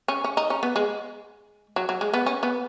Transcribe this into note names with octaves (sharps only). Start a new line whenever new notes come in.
C#4
C#4
D#4
C#4
B3
G#3
F#3
F#3
G#3
B3
C#4
B3